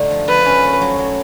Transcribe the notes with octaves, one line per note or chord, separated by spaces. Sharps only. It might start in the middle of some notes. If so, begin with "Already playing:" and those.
Already playing: D3 A3 D#4
F3
F3 B4
C#4
A3
F#3
F#3